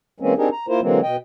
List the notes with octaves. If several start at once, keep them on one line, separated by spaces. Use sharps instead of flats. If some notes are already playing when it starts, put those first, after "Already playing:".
E3 G#3 A#3 C4 C#4
C4 D4 D#4 G4 G#4 A#4
A#5
A#3 E4 F4 A#4 C5
D3 E3 F#3 G#3 A#3 C4
B2 D#5 G5